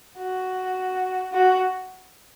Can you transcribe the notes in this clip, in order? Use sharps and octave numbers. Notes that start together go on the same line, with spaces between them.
F#4
F#4